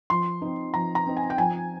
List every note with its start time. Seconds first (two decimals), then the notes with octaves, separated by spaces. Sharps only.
0.10 F3 C6
0.42 C4 D#4
0.74 F3 A#5
0.95 A#5
1.06 C4 D#4
1.17 G#5
1.30 G5
1.38 F3 G#5